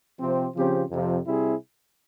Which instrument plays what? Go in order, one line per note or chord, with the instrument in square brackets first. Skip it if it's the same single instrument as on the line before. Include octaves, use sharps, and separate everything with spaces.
[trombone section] C3 F3 C4 G4 C5
C#3 F3 C4 G4 C5
F2 C3 F3
C3 G3 C4 E4 G#4